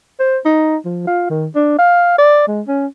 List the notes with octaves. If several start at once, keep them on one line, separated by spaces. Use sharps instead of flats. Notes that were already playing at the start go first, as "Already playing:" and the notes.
C5
D#4
F3
F4
D#3
D4
F5
D5
G#3
C#4